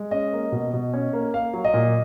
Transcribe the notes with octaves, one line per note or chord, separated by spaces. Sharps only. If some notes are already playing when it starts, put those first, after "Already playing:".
Already playing: G#3
C#4 D#5
A#3
B2
B2
C#4
A#3
A#3 F5
F#3
D#5
A#2